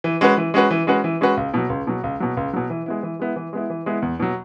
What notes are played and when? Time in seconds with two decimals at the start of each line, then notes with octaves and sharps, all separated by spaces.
0.04 E3
0.21 G#3 C#4 F#4 B4
0.37 E3
0.54 G#3 C#4 F#4 B4
0.70 E3
0.87 G#3 C#4 F#4 B4
1.04 E3
1.21 G#3 C#4 F#4 B4
1.37 C#2
1.54 B2 F#3
1.70 C#2
1.87 B2 F#3
2.04 C#2
2.20 B2 F#3
2.37 C#2
2.53 B2 F#3
2.70 E3
2.86 G#3 B3 E4
3.03 E3
3.19 G#3 B3 E4
3.36 E3
3.53 G#3 B3 E4
3.70 E3
3.86 G#3 B3 E4
4.02 E2
4.20 B2 F#3